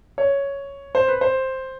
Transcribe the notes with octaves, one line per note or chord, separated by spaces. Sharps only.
C#5
C5
B4
C5